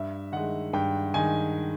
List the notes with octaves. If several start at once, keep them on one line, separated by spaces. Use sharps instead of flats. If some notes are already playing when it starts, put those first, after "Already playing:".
Already playing: G2 E5
D#3 G#3 F#5
G2 G5
D#3 G#3 G#5